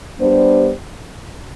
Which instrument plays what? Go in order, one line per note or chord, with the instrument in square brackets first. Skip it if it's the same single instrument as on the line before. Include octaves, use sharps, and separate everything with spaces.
[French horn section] G3 B3 D4 G4 C5